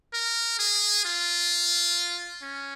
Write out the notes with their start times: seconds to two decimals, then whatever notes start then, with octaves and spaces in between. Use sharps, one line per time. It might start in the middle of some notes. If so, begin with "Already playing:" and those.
0.14 A#4
0.59 G#4
1.05 F4
2.43 C#4